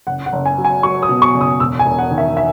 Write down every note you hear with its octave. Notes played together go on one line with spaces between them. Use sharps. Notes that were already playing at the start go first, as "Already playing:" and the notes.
F#1 F#5
F#5
F#1
G#5
F#3
G#5
F#3 C#6
D#6
B2
C#6
F#1
D#6
E1 E6
G#5
E1
F#5
D#3
E5
E5